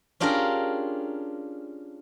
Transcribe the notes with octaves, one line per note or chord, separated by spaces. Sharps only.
C#4 D4 F4 G4 G#4 A#4